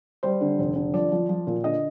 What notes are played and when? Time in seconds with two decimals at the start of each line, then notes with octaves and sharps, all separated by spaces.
0.23 G3 C5
0.41 D3
0.58 F1
0.76 D3
0.94 F3 D5
1.12 F3
1.29 F3
1.47 A#2
1.64 D3 D#5